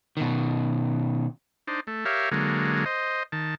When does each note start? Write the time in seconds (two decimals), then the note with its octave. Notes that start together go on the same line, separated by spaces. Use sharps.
0.17 B2 D#3
1.67 D4 D#4 C5
1.87 A3
2.05 G4 A#4 C#5 E5 F5
2.31 D3 F#3 G#3 A#3
2.86 C5 D#5
3.32 D#3 A5